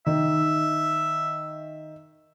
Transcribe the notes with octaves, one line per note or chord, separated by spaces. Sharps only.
D#3 E5